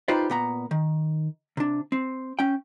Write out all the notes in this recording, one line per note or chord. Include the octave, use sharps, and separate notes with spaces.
D#4 F4 G4 B4 C5 D5
A#2 B3 A#5
D#3
C3 D4
C4
C#4 G5